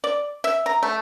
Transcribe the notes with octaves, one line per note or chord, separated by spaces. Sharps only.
D5
E5
A#5
A3